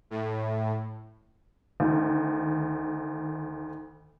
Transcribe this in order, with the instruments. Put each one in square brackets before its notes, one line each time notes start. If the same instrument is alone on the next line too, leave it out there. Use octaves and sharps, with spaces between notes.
[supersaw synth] A2
[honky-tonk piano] D2 D#3